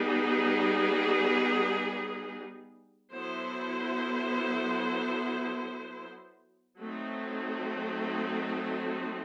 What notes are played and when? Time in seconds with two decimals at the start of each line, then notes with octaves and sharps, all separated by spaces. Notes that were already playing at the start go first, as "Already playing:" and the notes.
Already playing: G3 B3 D#4 G#4
3.13 F#3 B3 E4 A4 C5
6.79 F#3 A3 C4 D#4